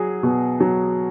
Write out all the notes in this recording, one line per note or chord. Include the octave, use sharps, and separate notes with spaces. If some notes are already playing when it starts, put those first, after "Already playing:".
Already playing: F#3 G#4
B2
F#3